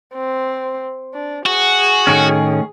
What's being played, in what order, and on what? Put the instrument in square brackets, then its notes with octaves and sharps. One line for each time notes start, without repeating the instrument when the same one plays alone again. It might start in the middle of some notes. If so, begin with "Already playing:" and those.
[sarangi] C4
D4
[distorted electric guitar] F#4 [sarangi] G#4
[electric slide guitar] A2 D#3 C#4